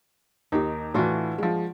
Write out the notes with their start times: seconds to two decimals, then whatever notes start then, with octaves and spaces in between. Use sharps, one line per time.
0.52 D#2 D#4 G4
0.94 A2 E3 D4 F4 F#4
1.38 F3 G#3